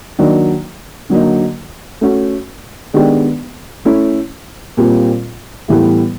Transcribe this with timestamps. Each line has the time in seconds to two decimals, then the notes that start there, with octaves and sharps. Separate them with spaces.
0.19 D#3 F#3 A#3 D4
1.10 D3 F#3 A#3 D#4
2.01 A3 C#4 F#4
2.94 D#3 G#3 B3 D4 G4
3.85 A3 C#4 E4
4.77 A#2 G3 C4 F4
5.68 A2 E3 G3 B3